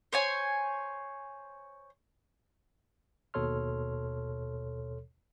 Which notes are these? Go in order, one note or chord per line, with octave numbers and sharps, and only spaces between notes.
C5 C#5 G#5
D#2 B2 A4 C#5 C6 F6